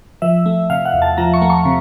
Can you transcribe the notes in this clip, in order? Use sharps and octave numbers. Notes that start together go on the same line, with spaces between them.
F3 E5
A3
C3 F5
F#5
E2
A5
F3 A#5
C#6
A3
C#6
C3